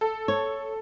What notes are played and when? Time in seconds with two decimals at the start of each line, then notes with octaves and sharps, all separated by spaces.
0.01 A4
0.28 C#5